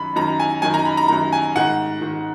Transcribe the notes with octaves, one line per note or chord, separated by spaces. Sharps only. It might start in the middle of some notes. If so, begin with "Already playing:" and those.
Already playing: F#2 D#3 B5
F#2 D#3 A#5
G#5
F#2 D#3 G#5
A#5
B5
A#5
F#2 D#3 A#5
G#5
G#2 D#3 F#5
G#2 D#3